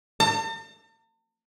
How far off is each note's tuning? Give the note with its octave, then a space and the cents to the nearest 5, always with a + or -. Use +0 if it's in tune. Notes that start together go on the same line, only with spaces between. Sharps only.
A5 +45